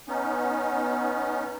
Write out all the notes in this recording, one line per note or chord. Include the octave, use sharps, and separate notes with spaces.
B3 C#4 D#4